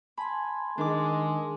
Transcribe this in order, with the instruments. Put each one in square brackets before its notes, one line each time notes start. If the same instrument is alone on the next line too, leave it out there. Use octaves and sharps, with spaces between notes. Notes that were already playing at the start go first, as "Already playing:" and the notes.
[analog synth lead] G#5 [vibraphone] A5 C6 [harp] B5
[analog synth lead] D#3 [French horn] G#3 [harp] D4 A#4 D6